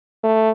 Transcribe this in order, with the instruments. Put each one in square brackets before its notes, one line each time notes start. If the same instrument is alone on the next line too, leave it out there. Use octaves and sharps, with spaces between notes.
[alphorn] A3